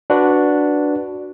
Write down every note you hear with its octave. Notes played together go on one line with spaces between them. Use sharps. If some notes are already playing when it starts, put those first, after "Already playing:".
D4 F#4 B4